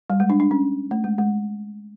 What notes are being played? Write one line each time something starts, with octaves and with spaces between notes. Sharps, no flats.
G3
G#3
D4
D4
C#4
A3
G#3
G#3